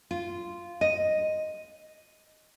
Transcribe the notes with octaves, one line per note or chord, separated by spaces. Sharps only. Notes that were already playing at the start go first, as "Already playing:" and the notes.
F4
D#5